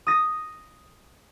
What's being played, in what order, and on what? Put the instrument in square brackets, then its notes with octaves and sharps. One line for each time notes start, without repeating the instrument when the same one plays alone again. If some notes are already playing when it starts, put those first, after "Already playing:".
[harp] D#6 A#6